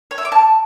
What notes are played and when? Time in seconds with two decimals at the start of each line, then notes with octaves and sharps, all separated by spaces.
0.11 C#5
0.18 E5
0.25 D6
0.32 A5